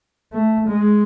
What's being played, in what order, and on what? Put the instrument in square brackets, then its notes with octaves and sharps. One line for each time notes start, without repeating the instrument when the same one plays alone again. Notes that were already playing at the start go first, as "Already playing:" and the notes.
[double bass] A3
G#3